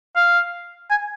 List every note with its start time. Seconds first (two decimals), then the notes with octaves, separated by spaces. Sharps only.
0.16 F5
0.91 G#5